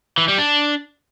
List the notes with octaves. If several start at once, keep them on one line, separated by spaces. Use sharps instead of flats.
E3
G3
D4